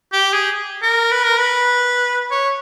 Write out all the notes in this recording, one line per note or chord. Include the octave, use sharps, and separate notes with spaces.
G4
G#4
A#4
B4
A#4
B4
C#5